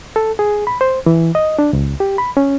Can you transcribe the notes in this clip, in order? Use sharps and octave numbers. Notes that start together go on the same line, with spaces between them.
A4
G#4
B5
C5
E3
D#5
D4
C#2
G4
B5
C#4